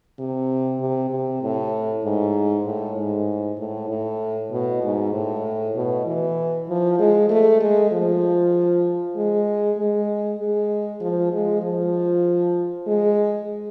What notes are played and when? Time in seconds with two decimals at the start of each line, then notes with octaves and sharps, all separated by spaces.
0.19 C3
0.80 C3
1.10 C3
1.42 A2
2.04 G#2
2.65 A2
2.96 G#2
3.58 A2
3.89 A2
4.51 B2
4.83 G#2
5.13 A2
5.75 B2
6.06 E3
6.68 F3
6.99 G#3
7.30 A3
7.60 G#3
7.92 F3
9.16 G#3
9.77 G#3
10.39 G#3
11.01 F3
11.32 G#3
11.62 F3
12.87 G#3